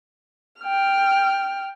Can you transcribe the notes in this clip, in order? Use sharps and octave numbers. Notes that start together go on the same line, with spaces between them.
G5 F6